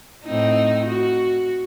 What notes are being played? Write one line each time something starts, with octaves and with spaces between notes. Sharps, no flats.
A2 C4 D#4
F#4